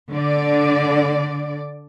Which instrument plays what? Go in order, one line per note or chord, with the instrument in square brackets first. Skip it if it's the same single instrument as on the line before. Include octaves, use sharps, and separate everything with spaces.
[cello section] D3 D5